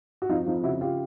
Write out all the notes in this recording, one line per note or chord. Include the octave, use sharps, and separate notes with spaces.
F#4
F2 D#4 F4
F2 D#4 F4
C#3 E4 F#4
F4 G4